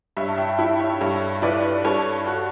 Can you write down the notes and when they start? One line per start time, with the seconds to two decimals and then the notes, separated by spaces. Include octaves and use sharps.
0.17 G2 C#5 E5
0.28 A5
0.37 E5 G5
0.59 E4 G5 B5
0.80 C#5 E5
1.01 G2 A4 C#5
1.42 E4 B4 D5
1.84 G2 A4 C#5
2.27 F#4